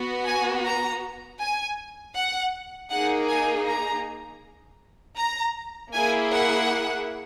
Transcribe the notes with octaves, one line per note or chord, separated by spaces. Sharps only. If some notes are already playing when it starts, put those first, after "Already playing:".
Already playing: B3 F#4
G#5
A#5
G#5
F#5
A#3 D#4 G#4 F#5
G#5
A#5
A#5
A#3 E4 G#4 G#5
F#5